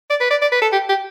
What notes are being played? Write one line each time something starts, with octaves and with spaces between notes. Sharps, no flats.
D5
B4
D5
D5
B4
A4
G4
G4